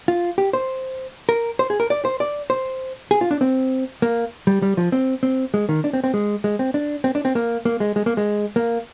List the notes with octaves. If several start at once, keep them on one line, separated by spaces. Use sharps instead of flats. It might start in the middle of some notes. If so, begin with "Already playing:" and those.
F4
G4
C5
A#4
C5
G#4
A#4
D5
C5
D5
C5
G#4
F4
D4
C4
A#3
G3
G3
F3
C4
C4
G#3
D#3
D4
C4
C4
G#3
G#3
C4
D4
C4
D4
C4
A#3
A#3
G#3
G#3
A#3
G#3
A#3